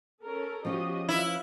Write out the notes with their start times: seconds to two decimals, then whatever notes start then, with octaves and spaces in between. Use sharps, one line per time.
0.22 C#4 A4 A#4
0.65 F3 C#4 F#4 G4 C#5 D#5
1.09 E4 F4 B4 E5